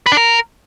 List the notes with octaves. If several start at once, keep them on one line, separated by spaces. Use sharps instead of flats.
B4
D4
A#4